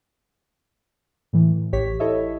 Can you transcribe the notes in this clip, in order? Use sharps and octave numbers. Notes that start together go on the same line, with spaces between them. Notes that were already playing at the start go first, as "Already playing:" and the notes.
A2 E3
A1 G4 C#5 B6
E4 A4 C#5 D#5 E5